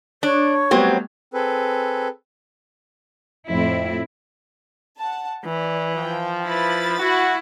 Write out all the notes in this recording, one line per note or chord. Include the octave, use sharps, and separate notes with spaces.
D4 C#5
F#3 G3 A3 B3 C4
C4 G#4 A4 B4
F2 A2 C4 E4
F#5 A5
E3 D5
F3 G5
E4 B4 B5 A6
E4 F#4